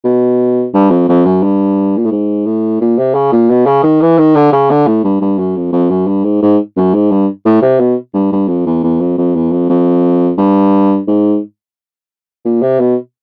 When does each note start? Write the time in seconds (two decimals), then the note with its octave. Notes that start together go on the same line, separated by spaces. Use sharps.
0.04 B2
0.74 G2
0.90 F2
1.09 F2
1.25 F#2
1.43 G2
1.97 A#2
2.05 A2
2.12 G#2
2.46 A2
2.81 A#2
2.98 C3
3.14 C#3
3.32 A#2
3.50 B2
3.66 C#3
3.83 D#3
4.01 E3
4.18 D#3
4.36 D3
4.52 C#3
4.70 D3
4.87 A2
5.04 G2
5.21 G2
5.38 F#2
5.56 F2
5.72 F2
5.90 F#2
6.07 G2
6.24 G#2
6.42 G#2
6.77 F#2
6.94 G#2
7.11 G2
7.45 A2
7.62 C3
7.79 B2
8.14 G2
8.32 G2
8.48 F2
8.66 E2
8.83 E2
9.00 F2
9.18 F2
9.35 E2
9.52 F2
9.69 F2
10.38 G2
11.07 G#2
12.45 A#2
12.62 C3
12.80 B2